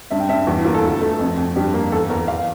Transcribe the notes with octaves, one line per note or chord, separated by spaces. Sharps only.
G2 E5
G5
G2 E5
E2 F4
E4
A#3 F4
A4
D2
A3
F2
F2
G2 G4
A#3
E2 A4
E2 A#4
E2 F5